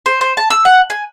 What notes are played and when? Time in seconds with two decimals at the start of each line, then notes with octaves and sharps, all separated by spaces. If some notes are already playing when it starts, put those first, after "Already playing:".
0.06 C5
0.21 C5
0.37 A5
0.50 E6
0.65 F#5
0.90 G#5